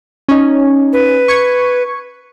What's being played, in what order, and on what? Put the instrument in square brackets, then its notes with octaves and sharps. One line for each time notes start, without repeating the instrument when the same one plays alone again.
[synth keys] C#4 D#4
[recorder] B4
[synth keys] C#6 G#6 C#7